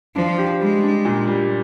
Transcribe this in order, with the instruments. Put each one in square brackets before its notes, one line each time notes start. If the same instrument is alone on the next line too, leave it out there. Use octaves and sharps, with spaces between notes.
[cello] F3 [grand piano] D4
[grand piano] G4
[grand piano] G3 [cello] G#3
[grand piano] D4
A#2
G3